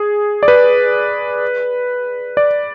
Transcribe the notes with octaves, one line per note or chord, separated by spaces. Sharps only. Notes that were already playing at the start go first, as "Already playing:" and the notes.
Already playing: G#4
D5
B4
D5